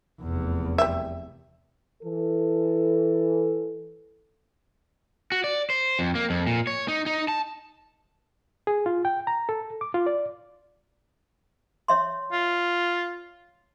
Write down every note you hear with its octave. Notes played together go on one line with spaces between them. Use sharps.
F1 E2
G3 E5
E3 A4
F#4
D5
C5
F2
A#3
F2
A#2
C#5
D#4
D#4
A5
G#4
F4
G5
A#5
A4
D6
F4
D5
C#5 E5 C6
F4